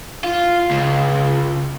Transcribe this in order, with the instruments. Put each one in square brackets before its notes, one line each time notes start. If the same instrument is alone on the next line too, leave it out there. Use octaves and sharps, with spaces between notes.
[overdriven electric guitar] F4
C#2